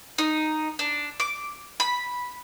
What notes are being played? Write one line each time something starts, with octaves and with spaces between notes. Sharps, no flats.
D#4
D4
D6
B5